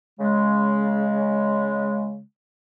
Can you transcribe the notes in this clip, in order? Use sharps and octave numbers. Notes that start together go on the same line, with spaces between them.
C#3 G#3